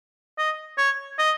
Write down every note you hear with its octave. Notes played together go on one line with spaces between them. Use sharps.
D#5
C#5
D#5